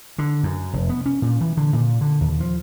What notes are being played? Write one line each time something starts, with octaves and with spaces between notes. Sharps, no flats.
D3
F#2
F1
B3
C#4
A#2
E3
D3
A#2
D3
D#2
F3